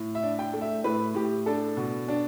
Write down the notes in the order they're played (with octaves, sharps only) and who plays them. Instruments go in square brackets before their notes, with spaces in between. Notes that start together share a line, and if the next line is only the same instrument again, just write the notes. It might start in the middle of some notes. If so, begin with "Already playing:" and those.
Already playing: [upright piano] A2
E5
D4
G5
A3
E5
A2 B4
A2 G4
D4 A4
B2
D4